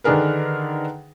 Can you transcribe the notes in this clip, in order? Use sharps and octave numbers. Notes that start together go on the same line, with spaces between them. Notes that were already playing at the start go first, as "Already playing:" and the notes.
D3 D#3 D4 G#4 A#4 B4